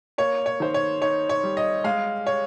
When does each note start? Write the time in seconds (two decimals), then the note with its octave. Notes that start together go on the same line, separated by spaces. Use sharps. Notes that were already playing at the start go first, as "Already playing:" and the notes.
0.18 A#3 C#5
0.46 C#5
0.60 D#3 C5
0.74 C#5
1.02 D#4 C#5
1.29 C#5
1.43 G3
1.57 D#5
1.84 G#3 F5
2.27 C#5